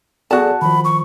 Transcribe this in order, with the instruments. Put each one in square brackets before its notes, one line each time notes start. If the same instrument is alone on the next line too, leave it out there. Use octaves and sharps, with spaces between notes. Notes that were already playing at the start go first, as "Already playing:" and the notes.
[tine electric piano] B3 G#4 A4 [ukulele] F#4 A5 [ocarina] D5
[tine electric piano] D#3 F3 [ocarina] B5
[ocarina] C#6